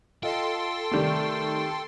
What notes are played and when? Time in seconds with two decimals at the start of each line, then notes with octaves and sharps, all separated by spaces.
0.23 F4 A4 D#5 G5 C6
0.91 C3 D#3 G3 A3 D5